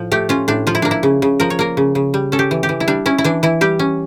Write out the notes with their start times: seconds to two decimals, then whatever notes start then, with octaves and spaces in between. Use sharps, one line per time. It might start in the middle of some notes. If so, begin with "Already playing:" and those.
Already playing: A2 F3
0.12 A3 G4
0.29 C#4 F4
0.48 A2 D4
0.67 F3 F4
0.75 E4
0.82 A#3 D4
0.91 E4
1.03 C#3
1.22 C#3
1.40 F3 A#4
1.50 C#5
1.59 A#3 A#4
1.77 C#3
1.95 C#3
2.14 G3
2.32 C#4 A4
2.39 G4
2.51 E3
2.63 G4
2.69 E3
2.80 E4
2.88 G3 D4
3.06 C#4 E4
3.18 E4
3.24 E3 D4
3.43 E3 E4
3.61 G3 G4
3.79 C#4